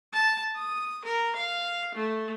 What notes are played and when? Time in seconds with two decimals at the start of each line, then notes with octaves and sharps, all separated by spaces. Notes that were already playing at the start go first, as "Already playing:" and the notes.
0.13 A5
0.55 D#6
1.05 A#4
1.36 F5
1.94 A3